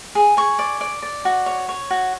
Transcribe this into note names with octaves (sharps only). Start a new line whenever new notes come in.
G#4
G#4 C#6
D5
D5
D5
F#4
C#5
C#5
F#4